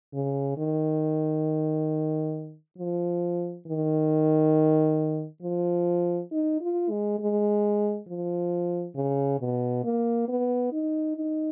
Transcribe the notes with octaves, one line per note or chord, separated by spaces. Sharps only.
C#3
D#3
F3
D#3
F3
D#4
F4
G#3
G#3
F3
C#3
B2
A#3
B3
D#4
D#4